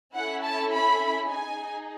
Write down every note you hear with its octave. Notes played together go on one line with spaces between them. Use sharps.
C#4 E4 A4 F#5
A5
B5
D#4 G#4 G#5